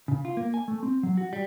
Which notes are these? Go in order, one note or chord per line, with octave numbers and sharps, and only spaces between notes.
C#3
F4
A#3
G#5
A3
C4
F#3
F#4
G3